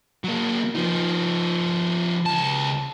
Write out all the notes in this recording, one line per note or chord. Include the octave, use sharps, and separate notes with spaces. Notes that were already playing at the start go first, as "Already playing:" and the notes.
F#3 A#3
F3 D#4
C#2 A5